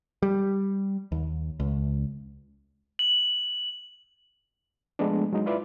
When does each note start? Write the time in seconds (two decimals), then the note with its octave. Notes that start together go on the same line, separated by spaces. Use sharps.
0.23 G3
1.12 D#2
1.60 C#2
2.99 F#7
4.99 F3 G#3 A3 B3 D4
5.33 F#3 G#3 D#4
5.46 E4 F4 B4 D5 E5